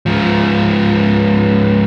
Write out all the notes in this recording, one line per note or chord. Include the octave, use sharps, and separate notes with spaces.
G#2 F3